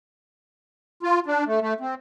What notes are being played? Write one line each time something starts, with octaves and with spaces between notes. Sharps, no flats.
F4
D4
A3
A3
C4